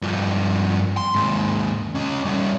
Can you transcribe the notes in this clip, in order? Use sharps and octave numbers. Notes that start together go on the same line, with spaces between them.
G2 F3
C6
D#2 G#2
C#4 D#5
G3 C#4